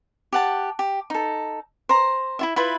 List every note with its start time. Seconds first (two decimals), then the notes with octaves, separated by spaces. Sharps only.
0.33 G4 F#5 A5
0.79 G4
1.10 D#4 A4
1.89 C5 A#5
2.39 E4 F4 E5
2.56 E4 F4 B4 E5